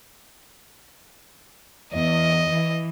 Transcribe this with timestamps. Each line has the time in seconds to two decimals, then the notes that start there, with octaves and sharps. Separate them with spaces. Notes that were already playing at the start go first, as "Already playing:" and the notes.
1.94 E2 D#5
2.50 E3